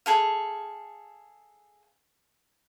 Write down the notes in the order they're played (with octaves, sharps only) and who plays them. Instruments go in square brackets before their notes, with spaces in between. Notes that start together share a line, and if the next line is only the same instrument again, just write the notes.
[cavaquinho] G#4 A4 F5